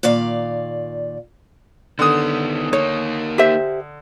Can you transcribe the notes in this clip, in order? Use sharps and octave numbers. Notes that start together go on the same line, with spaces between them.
A#2 D#3 D5 F5
D3 D#3 B3 D#6
A#3 D#4 C#5
G4 C5 E5